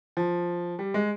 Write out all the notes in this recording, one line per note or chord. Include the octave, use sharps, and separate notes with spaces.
F3
G3
G#3